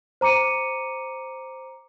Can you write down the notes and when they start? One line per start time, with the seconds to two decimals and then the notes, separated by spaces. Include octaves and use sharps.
0.21 C5 A#5 D6 C#7 D#7